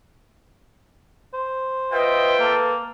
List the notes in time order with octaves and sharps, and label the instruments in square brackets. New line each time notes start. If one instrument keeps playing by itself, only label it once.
[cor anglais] C5
[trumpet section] F4 E5 G5 [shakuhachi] B4 [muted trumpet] D#5
[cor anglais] A#3 [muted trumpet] A4